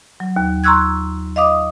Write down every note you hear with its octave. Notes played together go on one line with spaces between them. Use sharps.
F#3
D#2
A#5 C6 C#6 E6 F#6 G#6
D#5 F5 D6 D#6